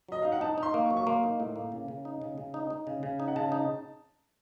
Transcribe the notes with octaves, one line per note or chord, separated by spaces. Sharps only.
F#3 D#5
D#4 F5
F#5
D#4 A5
D#4 C6
A#3
C#6
F#3
C#6
A#3 C6
D#4
A2
A#3
C#3
C#3
D#4
C#3
C#3
D#4
D#4
C#3
C#3
D#4
F#5
C#3 A5
D#4